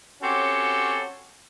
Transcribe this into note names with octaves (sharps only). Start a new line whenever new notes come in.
C4 C#4 F#4 G4 A4 C#5